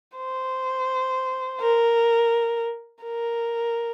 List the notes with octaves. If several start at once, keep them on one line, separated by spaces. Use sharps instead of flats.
C5
A#4
A#4